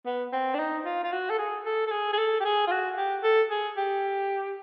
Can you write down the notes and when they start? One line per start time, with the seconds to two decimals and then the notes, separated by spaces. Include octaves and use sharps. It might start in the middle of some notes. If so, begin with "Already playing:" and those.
0.05 B3
0.32 C4
0.54 D4
0.59 D#4
0.85 F4
1.04 F4
1.12 F#4
1.30 A4
1.38 G#4
1.65 A4
1.86 A4
1.91 G#4
2.13 G#4
2.18 A4
2.40 G4
2.45 G#4
2.67 F4
2.71 F#4
2.97 G4
3.23 A4
3.50 G#4
3.77 G4